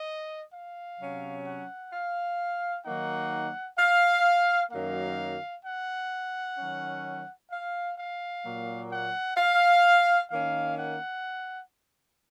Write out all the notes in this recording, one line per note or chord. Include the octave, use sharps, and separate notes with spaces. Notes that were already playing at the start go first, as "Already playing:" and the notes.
Already playing: D#5
F5
C3 F#3 C#4
F#5
F5
D#3 F#3 A#3 D#4 F#5
F5
F#2 D#3 F#3 A#3 F5
F#5
D#3 F#3 C#4
F5
F5
A#2 F#3 A#3
F#5
F5
D#3 A#3 C#4 F5
F#5